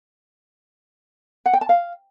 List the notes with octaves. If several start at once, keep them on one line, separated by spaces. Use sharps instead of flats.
F#5
G5
A5
F5